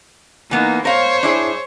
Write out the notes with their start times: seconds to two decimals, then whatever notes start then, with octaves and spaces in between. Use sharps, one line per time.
0.51 E3 A#3 B3 D#4
0.85 A#4 C5 C#5 F5
1.23 D4 E4 G#4